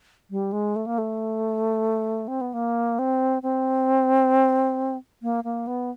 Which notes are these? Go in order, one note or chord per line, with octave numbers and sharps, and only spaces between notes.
G3
G#3
A3
A#3
A3
C4
B3
A#3
C4
C4
A#3
A#3
B3